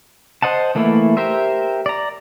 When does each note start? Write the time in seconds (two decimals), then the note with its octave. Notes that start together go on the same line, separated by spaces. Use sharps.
0.42 C5 D#5 F#5 A5
0.75 E3 A3 A#3 E4
1.17 G4 A#4 C5 E5
1.86 D5 A#5